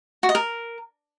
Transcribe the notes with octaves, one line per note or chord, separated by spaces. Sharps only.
F#4
D#5
A#4